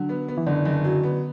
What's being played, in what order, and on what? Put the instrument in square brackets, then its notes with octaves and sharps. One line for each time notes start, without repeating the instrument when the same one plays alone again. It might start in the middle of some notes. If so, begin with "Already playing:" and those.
Already playing: [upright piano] D3 [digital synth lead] F#3
[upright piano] B3
B3
[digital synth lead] E3
[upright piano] F#1 [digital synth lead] D3
[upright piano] F#1
F#3
B3